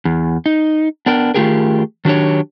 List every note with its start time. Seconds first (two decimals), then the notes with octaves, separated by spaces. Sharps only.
0.05 E2
0.46 D#4
1.06 B3 D4 A#4 G5
1.34 D#3 A3 F4 G4 G#4 A#4
2.05 D#3 F#3 D4 G4 C#5